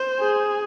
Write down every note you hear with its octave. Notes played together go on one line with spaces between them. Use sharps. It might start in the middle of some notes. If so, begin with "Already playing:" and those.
Already playing: C5
G#4